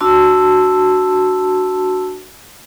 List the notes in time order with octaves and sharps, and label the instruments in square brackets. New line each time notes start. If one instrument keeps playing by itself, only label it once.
[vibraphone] D4 F#4 A5 C6 E6